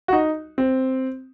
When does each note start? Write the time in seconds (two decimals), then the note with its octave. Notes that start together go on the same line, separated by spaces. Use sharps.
0.08 F#4
0.13 D#4
0.58 C4